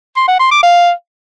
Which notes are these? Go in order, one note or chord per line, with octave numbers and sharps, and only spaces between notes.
C6
F#5
C6
D6
F5